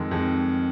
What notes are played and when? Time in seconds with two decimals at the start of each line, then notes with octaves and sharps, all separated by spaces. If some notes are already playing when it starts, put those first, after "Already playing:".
Already playing: F2 D#3 G#3
0.11 F2 D#3 G#3